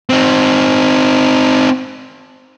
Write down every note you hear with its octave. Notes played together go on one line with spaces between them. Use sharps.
C4 D#4